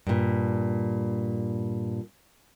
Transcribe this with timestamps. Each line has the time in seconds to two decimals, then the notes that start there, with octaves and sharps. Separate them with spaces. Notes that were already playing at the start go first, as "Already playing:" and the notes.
0.07 G2 A#2